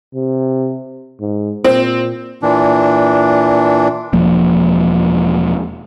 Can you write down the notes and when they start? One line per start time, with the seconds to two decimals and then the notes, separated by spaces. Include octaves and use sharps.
0.14 C3
1.20 G#2
1.64 A#2 C4
2.42 A#2 E3 D4
4.13 E1 F3 A#3